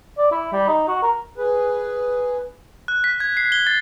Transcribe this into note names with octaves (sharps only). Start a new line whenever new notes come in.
D5
E4
G3
D#4
F#4
A#4
G#4 B4
F#6
B6
G#6
C7
G7
A6